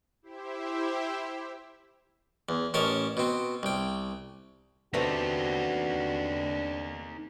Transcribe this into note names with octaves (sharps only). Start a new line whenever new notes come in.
E4 G4 C5 E5
E2
A1 C#4 A#4 D#5 A5
B2 C4
C2 G5
C3 A3 B3 D4 D#4 F#4 G4